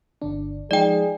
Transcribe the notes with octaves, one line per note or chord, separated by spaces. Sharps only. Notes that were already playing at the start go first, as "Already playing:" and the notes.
G1 D3 D4
F3 G#3 D#4 G#4 D5 G5